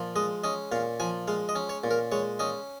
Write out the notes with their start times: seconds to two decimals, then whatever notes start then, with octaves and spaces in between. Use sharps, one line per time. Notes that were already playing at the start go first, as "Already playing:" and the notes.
Already playing: A#2 F3
0.16 G#3 D#5
0.44 C#4 D#5
0.72 A#2 F5
1.00 F3 G#5
1.28 G#3 F5
1.49 D#5
1.55 C#4
1.69 C#5
1.84 A#2
1.91 A#4
2.12 G#3 C#5
2.39 C#4 D#5